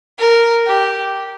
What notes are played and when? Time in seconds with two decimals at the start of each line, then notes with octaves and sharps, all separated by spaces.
0.19 A#4
0.67 G4